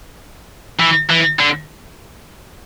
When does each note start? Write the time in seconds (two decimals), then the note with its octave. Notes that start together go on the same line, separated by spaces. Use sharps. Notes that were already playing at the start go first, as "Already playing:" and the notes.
0.80 E3
1.10 E3
1.39 D3